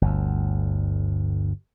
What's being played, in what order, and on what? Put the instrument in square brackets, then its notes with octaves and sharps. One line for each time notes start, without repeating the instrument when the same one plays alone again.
[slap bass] G1 D2